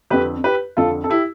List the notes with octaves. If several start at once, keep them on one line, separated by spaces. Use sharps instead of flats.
F2 D3 G4 B4
G4 B4
F2 D3 F4 A4
A4
E4 G4